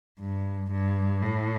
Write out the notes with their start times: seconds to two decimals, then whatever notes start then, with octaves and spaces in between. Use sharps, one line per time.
0.19 G2
0.71 G2
1.22 A2